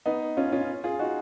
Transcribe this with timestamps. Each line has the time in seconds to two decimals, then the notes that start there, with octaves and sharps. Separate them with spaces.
0.06 B3 D#4
0.37 C#4 F4
0.52 C#4 F4
0.84 F4 G#4
0.99 D#4 F#4